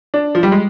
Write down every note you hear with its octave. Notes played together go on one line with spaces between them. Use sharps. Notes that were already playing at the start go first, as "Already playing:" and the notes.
D4
F3
G3
G#3